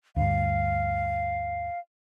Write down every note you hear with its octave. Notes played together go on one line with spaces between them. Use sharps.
D2 G2 F5